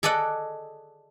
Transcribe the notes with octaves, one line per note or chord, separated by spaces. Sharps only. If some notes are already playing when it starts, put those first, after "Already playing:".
G#4 A4 D5 D#5 F#5